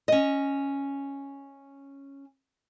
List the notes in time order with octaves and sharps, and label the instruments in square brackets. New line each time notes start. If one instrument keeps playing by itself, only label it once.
[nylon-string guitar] C#4 D#5